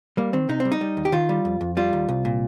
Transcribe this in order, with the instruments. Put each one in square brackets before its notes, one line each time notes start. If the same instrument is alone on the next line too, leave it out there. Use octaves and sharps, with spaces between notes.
[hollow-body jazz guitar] G3 A#3
D#3 C4
C3 D#4
C4
G3
D#4
G3
D#2
G4
D#3 F4
G3
F2
F2
G3 F4
D#2
C2
A#2